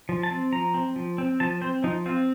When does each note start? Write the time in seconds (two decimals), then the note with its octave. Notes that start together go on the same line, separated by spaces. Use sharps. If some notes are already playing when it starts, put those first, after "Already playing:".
0.09 F3
0.23 A5
0.31 C4
0.52 F3 A#5
0.74 C4
0.96 F3
1.18 C4
1.40 F3 A5
1.62 C4 C5
1.84 F3 D#4
2.06 C4 F4